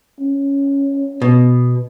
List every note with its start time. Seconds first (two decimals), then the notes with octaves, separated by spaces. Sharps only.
0.20 C#4
1.22 B2